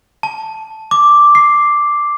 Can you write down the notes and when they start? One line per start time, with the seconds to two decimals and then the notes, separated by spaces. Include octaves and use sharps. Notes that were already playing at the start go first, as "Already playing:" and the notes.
0.23 A5
0.91 D6
1.35 C7